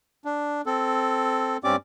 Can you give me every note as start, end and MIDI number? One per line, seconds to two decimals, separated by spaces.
0.25 0.61 62
0.66 1.57 60
0.66 1.57 69
1.64 1.76 43
1.64 1.76 60
1.64 1.76 61
1.64 1.76 67
1.64 1.76 74
1.64 1.76 86